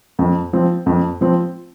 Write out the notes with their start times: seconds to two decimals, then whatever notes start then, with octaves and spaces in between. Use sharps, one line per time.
0.19 F2
0.53 F3 C4
0.86 F2
1.21 F3 C4